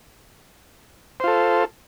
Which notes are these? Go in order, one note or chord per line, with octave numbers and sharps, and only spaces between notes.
F4 A4 C5